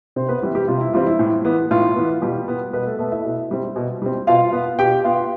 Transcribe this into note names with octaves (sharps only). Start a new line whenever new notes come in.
C3 C4 C5
B3 B4
E3 G3 C4 E4
G3 G4
C3 F4
E4
E3 G3 C4 F4
E4
A2
E3 B3
A2 F4
E3 B3
B2 G3 G4
B3
B2 B3 B4
A3 A4
A3 B3 A4
E4 E5
B2
G3 C4
B2
G3 C4
B2 F4 F5
B3
B2 G4 G5
B3 F4 F5